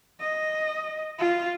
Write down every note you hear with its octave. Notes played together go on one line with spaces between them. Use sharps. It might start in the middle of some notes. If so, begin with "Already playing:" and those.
D#5
F4